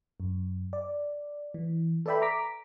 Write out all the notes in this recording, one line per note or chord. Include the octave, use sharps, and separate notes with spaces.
F#2
D5
E3
A4 B4 D5 E5 G5 B5
A#5 D6 B6